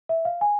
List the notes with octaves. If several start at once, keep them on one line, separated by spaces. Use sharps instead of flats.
E5
F5
G#5